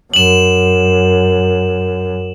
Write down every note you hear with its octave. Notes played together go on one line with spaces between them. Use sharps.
F#2 E7 F#7